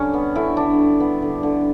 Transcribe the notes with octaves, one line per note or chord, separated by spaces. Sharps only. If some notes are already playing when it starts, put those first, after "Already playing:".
Already playing: D3 G3 C#4
B3
D3 E4
D3 D4
G3
B3
D3
D3